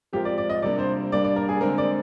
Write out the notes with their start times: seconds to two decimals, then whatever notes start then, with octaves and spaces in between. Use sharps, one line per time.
0.13 F3 G#3 C4 F4 G4 A#4
0.25 D5
0.38 D5
0.50 D#5
0.62 C3 G3 A#3 D4 D5
0.79 C5
1.12 G3 A#3 D4 D5
1.24 D5
1.36 A#4
1.49 G#4
1.61 D3 G#3 C4 A#4
1.78 D5